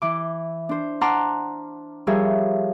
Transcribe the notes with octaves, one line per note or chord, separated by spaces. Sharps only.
E3 D6
D4 C5
F#5 A5 A#5 C6 D6 F6
F3 G3 G#4 A#4 C#5 E5